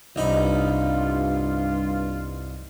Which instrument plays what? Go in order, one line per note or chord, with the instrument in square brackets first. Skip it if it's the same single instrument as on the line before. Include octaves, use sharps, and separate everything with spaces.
[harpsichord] C2 D#4 B5 [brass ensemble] G2 F4